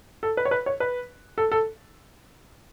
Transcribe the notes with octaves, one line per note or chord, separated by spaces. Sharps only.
A4
B4
C#5
B4
C#5
B4
A4
A4